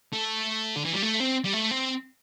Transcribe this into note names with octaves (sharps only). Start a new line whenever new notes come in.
A3
D3
E3
G3
A3
C4
G3
A3
C4